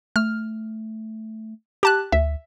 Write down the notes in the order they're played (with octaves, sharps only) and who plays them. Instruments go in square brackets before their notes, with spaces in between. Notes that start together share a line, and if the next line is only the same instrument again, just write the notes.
[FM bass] A3 [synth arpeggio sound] F6
[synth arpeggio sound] G4 A5 F#6
[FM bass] D2 [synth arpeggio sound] E5